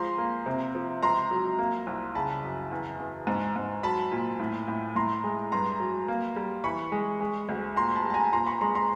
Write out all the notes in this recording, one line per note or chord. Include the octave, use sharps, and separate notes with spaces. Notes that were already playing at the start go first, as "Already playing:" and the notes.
Already playing: F3 G#3 A#5 C6
A#3
C3
F3
C#2 A#5 C6
F#3
A#3
C2
C#3 A5 B5
F#2
E2
E2
G#2
G#2
F#3 A5 B5
A#2
A2
A2
A2 A#5 C6
G#3
G2 A#5 C6
F#3
A#3
G3
E3 B5 C#6
G#3
G#3
D2
A#2 A#5 C6
A5 B5
G3
A5
G#5 A#5
A#2 A#5 C6
B5 C#6
G#3 A#5 C6
A#5 C6